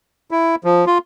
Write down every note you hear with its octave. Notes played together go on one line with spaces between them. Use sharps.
E4
F3
F4